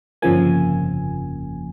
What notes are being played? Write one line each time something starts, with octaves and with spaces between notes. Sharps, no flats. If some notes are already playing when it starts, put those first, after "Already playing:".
G1 F2 C#3 F3 A#3 G#5